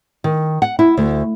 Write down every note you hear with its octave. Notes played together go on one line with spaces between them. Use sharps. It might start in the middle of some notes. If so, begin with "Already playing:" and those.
D#3
F#5
E4
D2